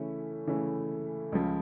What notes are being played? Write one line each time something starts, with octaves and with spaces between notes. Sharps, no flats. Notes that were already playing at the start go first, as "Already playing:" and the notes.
Already playing: C#3 E3 A3 C#4 E4
C#3 E3 A3 C#4 E4
C#2 C#3 F3